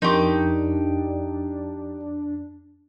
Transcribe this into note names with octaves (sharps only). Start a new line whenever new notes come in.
F2 D4 D#4 G4 A#4 C6 C#6